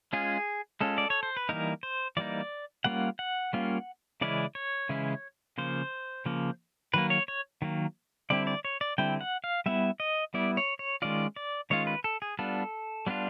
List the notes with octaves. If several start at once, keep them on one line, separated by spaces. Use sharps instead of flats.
G#3 C#4 F4 G#4
G#3 C#4 F4 A4
D5
C#5
C5
B4
E3 G3 A#3 D#4 A#4
C5
E3 G3 A#3 D#4 D5
G3 A#3 C#4 F4 F#5
F#5
G3 A#3 C#4 F4
C#3 E3 G#3 C#4 E4 D5
C#5
C#3 E3 G#3 C#4 E4
C#3 F3 A#3 C5
C#3 F3 A#3
D#3 F#3 A#3 B4
C#5
C#5
D#3 F#3 A#3
D3 G3 C4 E4 D5
D5
C#5
D5
D3 G3 C4 E4 G5
F#5
F5
G3 B3 E4 E5
D#5
G3 B3 E4 D5
C#5
C#5
D#3 G#3 C#4 F4 D5
D5
D#3 G#3 C#4 F4 C#5
B4
A4
G#4
G3 B3 D4 F4 A4
G3 B3 D4 F4